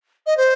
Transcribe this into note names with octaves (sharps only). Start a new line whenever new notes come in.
D#5
C5